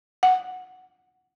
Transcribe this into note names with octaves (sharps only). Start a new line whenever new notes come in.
F#5